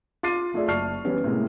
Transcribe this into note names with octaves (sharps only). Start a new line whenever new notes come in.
F4 D6 A6 C7 D#7
A3 F4 G#4 D5 E5
F#1 D5 A5 C#6 F6 C7
E3 G3 B3 C#4 E4 B4
A2 C3 G#3 A#3